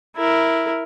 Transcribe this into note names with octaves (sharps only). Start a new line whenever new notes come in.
E4 A#4